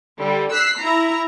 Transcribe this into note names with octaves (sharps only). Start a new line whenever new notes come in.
D3 G3
E6 F#6 B6 C7
E4 A#5